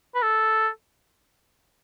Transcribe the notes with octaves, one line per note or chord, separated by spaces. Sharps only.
B4
A4